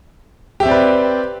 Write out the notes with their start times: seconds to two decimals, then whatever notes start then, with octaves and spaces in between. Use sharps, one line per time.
0.60 G4
0.63 E5
0.66 C4
0.68 D5
0.71 B4